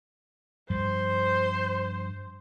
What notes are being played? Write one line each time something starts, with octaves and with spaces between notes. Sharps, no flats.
G2 F3 C5